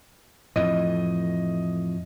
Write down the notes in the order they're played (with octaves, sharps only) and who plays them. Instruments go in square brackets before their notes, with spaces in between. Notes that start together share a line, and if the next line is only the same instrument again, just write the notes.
[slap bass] F2 A2 E3 [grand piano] D#5